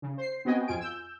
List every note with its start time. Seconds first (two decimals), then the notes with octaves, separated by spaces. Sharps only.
0.02 C#3
0.18 C5 C7
0.45 B3 C4 F#4 D#5 G5 G#5
0.68 F2 F4 G#5 D7
0.80 E6 G6